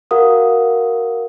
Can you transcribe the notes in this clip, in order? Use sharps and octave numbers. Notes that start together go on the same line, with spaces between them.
F#4 A#4 F5 F#5 D#6